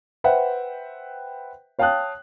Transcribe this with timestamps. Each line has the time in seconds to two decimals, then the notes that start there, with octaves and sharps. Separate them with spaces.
0.24 B4 C5 E5 F#5 G5
1.79 C#5 F5 G5 A5 D#6 F#6